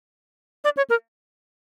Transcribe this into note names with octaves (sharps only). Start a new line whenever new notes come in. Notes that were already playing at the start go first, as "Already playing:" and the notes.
D5
C#5
A#4